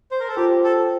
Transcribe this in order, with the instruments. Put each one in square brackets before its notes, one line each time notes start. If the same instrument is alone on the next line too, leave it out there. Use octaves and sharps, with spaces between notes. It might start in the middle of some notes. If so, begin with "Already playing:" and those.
[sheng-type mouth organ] C5
A#4
A4
[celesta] F4 C5 G5 [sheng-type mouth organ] G4
[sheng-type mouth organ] A4